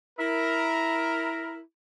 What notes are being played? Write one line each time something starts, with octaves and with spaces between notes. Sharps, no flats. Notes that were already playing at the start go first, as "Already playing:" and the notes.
E4 A#4